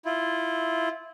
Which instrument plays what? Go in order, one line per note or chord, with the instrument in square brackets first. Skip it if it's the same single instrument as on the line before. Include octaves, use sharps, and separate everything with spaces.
[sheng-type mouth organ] E4 F4